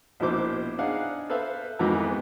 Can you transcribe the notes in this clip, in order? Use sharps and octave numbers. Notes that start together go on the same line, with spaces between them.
A#1 B2 F3 E4 C5 D6
D4 D#4 G#4 F5 F#5
A4 B4 C5 E5 F5
F2 G#2 D#3 E3 B3 D6
G4